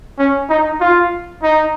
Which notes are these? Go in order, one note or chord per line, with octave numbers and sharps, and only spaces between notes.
C#4
D#4
F4
D#4